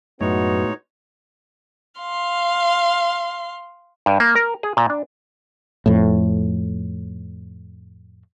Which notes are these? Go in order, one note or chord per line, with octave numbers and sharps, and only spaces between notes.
F#2 A2 G#3 B3 D#4 F#4 C#5
F5 C6
G2
A#3
A#4
G#4
A#2
D4
F2 A2